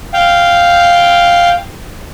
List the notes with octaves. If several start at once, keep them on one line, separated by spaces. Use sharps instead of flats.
F5 G5